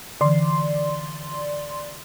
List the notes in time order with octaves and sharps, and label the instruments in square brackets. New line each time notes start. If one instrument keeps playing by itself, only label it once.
[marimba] D3 E3 [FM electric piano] D5 C6